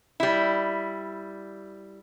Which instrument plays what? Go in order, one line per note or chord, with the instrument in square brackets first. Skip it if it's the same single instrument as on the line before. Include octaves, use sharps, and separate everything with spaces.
[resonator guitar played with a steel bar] G3 E4